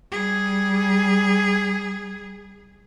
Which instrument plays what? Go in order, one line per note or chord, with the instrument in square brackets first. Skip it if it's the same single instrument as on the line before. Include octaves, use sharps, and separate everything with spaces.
[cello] G3 G#4